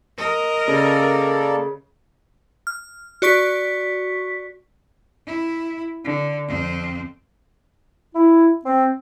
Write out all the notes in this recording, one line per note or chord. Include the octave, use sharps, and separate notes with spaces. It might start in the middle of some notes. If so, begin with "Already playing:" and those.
A#4 D#5
C#3 A#3 A4 D5
F6
F#4 D5 C#6 B6
E4
D3
F2 C4
E4
C4